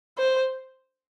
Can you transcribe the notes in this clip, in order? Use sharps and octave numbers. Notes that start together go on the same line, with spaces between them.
C5